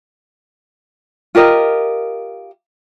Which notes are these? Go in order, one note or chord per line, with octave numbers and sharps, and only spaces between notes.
F4 G4 A#4 D#5